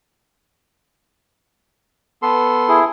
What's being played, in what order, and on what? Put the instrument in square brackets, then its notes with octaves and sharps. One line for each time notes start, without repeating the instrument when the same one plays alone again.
[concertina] B3 A4 C6
[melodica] E4 G#4